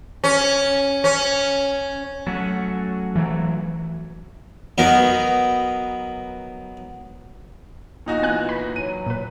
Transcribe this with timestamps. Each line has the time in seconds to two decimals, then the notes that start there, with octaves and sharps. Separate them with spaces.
0.24 C#4
1.04 C#4
2.27 F#3 A3 C#4 F#4
3.16 E3 F#3
4.78 F#3 B3 D#4 A#4
8.06 A#2 D#4 F#4
8.23 E3 B3 G#5 F#6
8.49 B5
8.76 F#3 D#7
9.06 A#2 B4